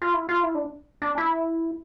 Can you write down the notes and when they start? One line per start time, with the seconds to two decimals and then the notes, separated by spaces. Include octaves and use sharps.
0.02 F4
0.14 E4
0.29 F4
0.43 E4
0.55 D4
1.02 D4
1.18 E4